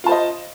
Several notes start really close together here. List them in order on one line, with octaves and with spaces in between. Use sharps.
F4 A5 C5 D#5